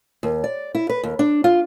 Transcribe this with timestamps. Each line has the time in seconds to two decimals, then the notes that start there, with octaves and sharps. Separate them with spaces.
0.23 D#2
0.44 D5
0.75 E4
0.90 B4
1.03 D#2
1.19 D4
1.44 F4